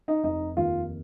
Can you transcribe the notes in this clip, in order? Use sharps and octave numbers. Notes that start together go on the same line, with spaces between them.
D#4
F1 D#4
D#2 F4